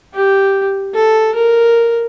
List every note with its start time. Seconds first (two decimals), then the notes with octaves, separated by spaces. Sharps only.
0.14 G4
0.94 A4
1.35 A#4